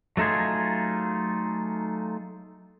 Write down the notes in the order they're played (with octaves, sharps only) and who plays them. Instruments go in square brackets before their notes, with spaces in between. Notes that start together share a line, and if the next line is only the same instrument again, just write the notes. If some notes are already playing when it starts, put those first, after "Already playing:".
[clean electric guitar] F#3 A3 D#4 F4 G#4